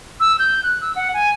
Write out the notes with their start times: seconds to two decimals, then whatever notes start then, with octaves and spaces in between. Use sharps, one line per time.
0.20 E6
0.39 G6
0.63 F#6
0.81 E6
0.96 F#5
1.14 G#5